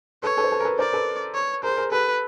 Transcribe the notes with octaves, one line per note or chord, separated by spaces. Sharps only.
A4 B4 C#5
A4 B4
C5
A4 B4
A#4
A4 B4
A#4 C5 D5
A4 B4
C#5
G#4 A#4 C5
G#4 A#4
G4 A4 B4